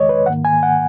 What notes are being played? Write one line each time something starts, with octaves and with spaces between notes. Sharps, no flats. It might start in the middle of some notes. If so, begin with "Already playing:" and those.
Already playing: E2 D#3 G#3 C#5 D#5
B4
G#2 D#3 A#3 F#5
G#5
F#5